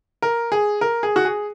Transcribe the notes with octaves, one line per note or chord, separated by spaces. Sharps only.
A#4
G#4
A#4
G#4
F#4
G#4